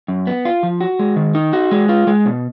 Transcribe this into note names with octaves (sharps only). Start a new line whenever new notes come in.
F#2
B3
F4
F3
F#4
G#3
D#3
D#4
F#4
G#3
F4
G#3
B2